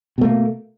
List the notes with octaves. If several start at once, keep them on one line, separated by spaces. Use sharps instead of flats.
B2 A3 A#3